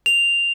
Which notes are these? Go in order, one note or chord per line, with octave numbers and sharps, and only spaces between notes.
F7